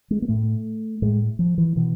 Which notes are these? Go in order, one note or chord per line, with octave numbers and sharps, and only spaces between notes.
G#3
A#3
A2 A3
A2 G#3
F3
E3
B2 E3